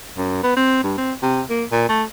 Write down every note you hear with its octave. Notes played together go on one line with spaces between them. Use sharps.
F#2
B3
C4
G2
C4
C3
A#3
A#2
A3